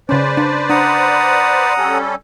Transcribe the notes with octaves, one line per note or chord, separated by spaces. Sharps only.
C#3 C#4 B4 C5 D5
D4
D4 F#5 A#5 D#6
G3 C#4 A4